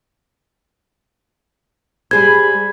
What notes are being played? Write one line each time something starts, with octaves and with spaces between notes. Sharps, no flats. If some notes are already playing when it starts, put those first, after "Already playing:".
G3 G#4 C5 B5 G#6